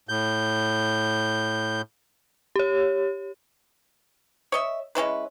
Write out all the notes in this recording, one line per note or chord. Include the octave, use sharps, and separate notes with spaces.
A2 G6
G4 C#5
C#5 D#5 E5
G#3 C#4 E4 B4